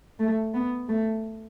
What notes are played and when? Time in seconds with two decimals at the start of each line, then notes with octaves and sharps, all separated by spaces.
0.19 A3
0.54 B3
0.89 A3